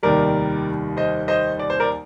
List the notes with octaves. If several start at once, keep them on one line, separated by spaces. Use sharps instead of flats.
F1 D#2 D#3 G3 A#4 D5
C5 D#5
C5 D#5
D5
C5
A#4 D5